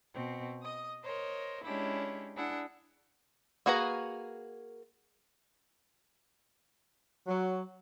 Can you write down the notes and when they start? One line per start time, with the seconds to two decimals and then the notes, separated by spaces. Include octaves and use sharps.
0.14 B2 C4
0.62 D#5 D#6
1.04 A#4 C5 C#5 D#5
1.65 G#3 C#4 D4 E4 G4
2.36 D4 E4 G#4 F#5
3.66 A#3 F#4 G#4 B4 A#5
7.28 F#3